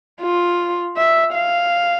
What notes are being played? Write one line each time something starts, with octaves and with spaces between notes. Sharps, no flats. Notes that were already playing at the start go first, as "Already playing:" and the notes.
F4
E5
F5